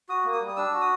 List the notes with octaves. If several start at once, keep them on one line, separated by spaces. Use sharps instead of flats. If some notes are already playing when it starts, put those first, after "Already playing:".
F#4 D#6
A#3
D#6
G3
D#6
D4 E6
F#4
D#6